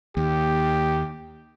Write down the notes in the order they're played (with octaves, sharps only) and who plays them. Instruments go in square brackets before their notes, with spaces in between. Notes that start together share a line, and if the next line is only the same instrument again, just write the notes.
[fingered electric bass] D#2 [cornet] G4